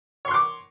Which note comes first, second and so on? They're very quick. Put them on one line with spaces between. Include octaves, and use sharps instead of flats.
C#5 C6 F#6 D6